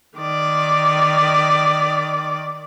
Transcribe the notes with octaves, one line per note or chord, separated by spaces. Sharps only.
D#3 D5